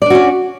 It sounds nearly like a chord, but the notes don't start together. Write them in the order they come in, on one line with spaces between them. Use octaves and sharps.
D5 D4 F#4 C#4